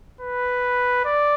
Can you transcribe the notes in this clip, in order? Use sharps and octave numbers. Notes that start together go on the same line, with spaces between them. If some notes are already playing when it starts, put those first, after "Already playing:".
B4
D5